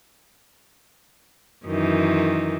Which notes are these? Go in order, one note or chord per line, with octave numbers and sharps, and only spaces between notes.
F#2 D#3 E3